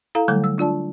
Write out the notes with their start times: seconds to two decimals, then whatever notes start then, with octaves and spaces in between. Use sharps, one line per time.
0.15 E4 A4 F5 A#5
0.28 D3 F#3 G3 A3 A4 G6
0.44 E6
0.58 D4 F4 D5 A5